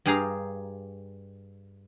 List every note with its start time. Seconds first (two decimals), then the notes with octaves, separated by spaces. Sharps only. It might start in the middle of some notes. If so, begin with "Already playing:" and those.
0.06 G2 G4 G#4 F5 A#5